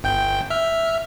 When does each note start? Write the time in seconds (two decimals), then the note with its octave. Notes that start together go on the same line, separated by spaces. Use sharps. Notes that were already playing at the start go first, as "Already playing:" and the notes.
0.04 G1 G5 G6
0.50 E5 F6